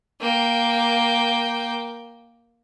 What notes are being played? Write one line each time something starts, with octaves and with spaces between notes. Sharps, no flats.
A#3 G5